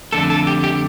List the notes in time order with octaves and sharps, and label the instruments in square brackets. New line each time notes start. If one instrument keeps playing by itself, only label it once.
[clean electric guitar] F2 D3 A3 A4
A4
G4
G4